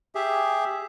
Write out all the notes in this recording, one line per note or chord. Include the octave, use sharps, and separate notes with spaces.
G4 G#4 E5